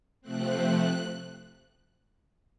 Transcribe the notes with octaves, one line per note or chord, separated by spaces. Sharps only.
C3 F3 A3 C4 F#6